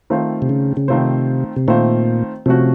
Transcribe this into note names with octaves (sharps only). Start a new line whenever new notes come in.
D#3 A3 C4 F4 C5
C3
C#3
C#3
C3 D#3 A3 C4 F4 C5
C3
A#2 D#3 A3 C4 F4 C5
C3 F3 A3 C#4 F#4